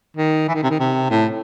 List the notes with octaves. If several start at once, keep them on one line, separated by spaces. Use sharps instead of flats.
D#3
E3
D#3
C3
D#3
C3
A2